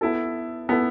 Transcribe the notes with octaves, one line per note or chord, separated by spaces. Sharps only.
B3 E4 A4
B3 E4 A4